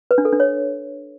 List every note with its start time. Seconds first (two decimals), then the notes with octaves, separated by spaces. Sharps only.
0.11 B4
0.18 D4
0.25 A4
0.32 D4
0.40 C#5